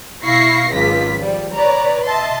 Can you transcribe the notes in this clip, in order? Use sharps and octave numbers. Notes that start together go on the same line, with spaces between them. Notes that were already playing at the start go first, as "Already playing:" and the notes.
B2 E4 F5 C#6 A#6 C7
G#1 C#2 F#3 F4 B6
F3 G3
B4 C#5 D5 A#5
D#5 E5 A5 C6